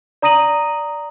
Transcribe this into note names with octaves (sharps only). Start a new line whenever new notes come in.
D5 A#5 D#6 A#6 D#7 F#7